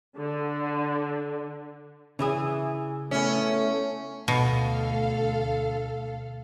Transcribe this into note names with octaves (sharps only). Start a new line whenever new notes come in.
D3
C#3 E3 E4 G#4
A3 B3 C#4 E4
D2 B2 A4 F5